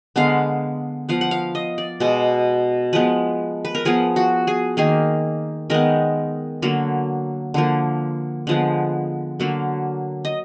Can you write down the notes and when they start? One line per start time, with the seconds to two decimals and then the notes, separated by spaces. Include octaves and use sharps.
0.16 D3 G#3 B3 F5
1.09 F3 B3 F5
1.21 F#5
1.31 F5
1.55 D#5
1.78 D5
2.00 B2 G#3 B3
2.93 F3 G#3 B3 B4
3.65 B4
3.75 A#4
3.85 F3 B3 G#4
4.16 F#4
4.47 G#4
4.77 D#3 A#3 G#4
5.70 D#3 G#3 B3 A#4
6.62 D3 F#3 A#3
7.54 D3 F3 A#3
8.47 D3 F3 G#3 B3
9.40 D3 F#3 A#3
10.25 D#5